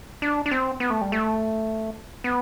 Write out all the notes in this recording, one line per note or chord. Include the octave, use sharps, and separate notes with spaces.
D4
D4
C4
B3
A3
G3
A3
B3